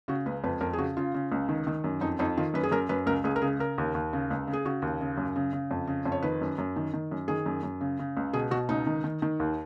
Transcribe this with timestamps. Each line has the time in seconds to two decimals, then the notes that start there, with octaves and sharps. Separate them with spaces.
0.08 C#3 F#4
0.26 C#2 B4
0.44 F2 B4
0.61 F2 A#4
0.73 G#4
0.78 C#3 F#4
0.97 C#3 F4
1.14 C#3
1.32 C#2
1.49 D#3
1.67 D#3
1.84 F#2
2.01 F2 D#4
2.19 F2 D#4
2.37 D#3 F4
2.54 F#2 B4
2.63 G#4
2.71 F#2 A#4
2.89 F#2 B4
3.06 C#2 A#4
3.24 C#2 G#4
3.36 A#4
3.42 C#3 G#4
3.59 C#3 A#4
3.78 D#2
3.95 D#2
4.13 C#3
4.31 C#2
4.47 C#3
4.53 G#4
4.65 C#3 F#4
4.82 D#2
5.01 C#3
5.17 F#2
5.36 C#3
5.53 C#3
5.71 F2
5.87 C#3
6.06 F2
6.12 C#5
6.23 D#3 B4
6.41 F#2
6.58 F#2
6.76 D#3
6.93 D#3
7.11 F#2
7.28 D#3 G#4
7.46 F#2
7.63 F#2
7.81 C#3
7.99 C#3
8.17 C#2
8.33 B2 G#4
8.51 B2 F#4
8.69 C#2 D#4
8.86 D#3
9.04 D#3
9.22 D#3
9.40 D#2